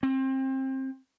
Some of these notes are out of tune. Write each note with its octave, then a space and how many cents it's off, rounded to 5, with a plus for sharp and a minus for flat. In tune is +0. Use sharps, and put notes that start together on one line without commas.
C4 +25